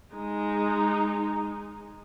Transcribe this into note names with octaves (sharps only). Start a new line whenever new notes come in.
G#3 D#4